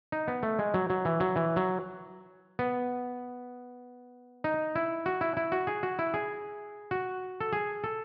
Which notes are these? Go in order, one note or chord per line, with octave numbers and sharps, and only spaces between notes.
D#4
B3
A3
G#3
F#3
F#3
E3
F#3
E3
F#3
B3
D#4
E4
F#4
E4
E4
F#4
G#4
F#4
E4
G#4
F#4
A4
G#4
A4